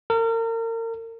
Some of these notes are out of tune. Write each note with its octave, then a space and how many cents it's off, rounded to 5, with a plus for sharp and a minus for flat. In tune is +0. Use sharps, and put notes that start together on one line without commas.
A#4 -35